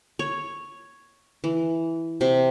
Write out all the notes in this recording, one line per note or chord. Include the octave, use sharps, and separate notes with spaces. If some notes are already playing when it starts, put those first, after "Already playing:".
C#5
E3
C3